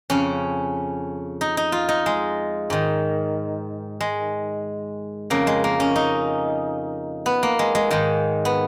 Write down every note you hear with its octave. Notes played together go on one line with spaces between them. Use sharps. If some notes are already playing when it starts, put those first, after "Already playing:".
F2 C#3 C#4
D#4
D#4
F4
D#4
G#3
G#2 D#3
G#3
F2 C#3 A#3
G#3
A#3
C#4
D#4
B3
A#3
G#3
G#3
G#2 D#3 G#3
B3